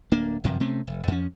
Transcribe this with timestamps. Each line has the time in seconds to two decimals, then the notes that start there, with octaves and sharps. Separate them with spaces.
0.12 D1 A#3 D4
0.44 G1 F#2 C3 F3
0.60 C3 A3 C4 C#4
0.87 F1
1.08 F2 F3 C#4